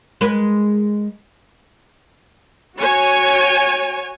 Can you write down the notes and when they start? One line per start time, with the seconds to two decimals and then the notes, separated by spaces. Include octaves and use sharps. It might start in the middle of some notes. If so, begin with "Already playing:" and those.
0.21 G#3 A#4 B4
2.78 F#4 C#5 G#5